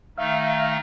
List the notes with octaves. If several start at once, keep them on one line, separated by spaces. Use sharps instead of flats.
D#3 A3 D#4 E5 F5